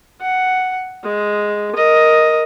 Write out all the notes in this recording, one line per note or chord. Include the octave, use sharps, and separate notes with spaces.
F#5
G#3
A#4 D#5